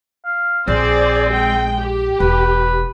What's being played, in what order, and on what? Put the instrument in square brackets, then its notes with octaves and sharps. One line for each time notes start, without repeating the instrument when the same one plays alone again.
[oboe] F5
[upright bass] A#1 [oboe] C4 [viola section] G#4 C5 D5
[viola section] G#3 G5
G4
[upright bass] E1 [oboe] B4